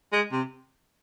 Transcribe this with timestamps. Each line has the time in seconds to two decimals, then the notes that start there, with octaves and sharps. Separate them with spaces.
0.12 G#3
0.32 C3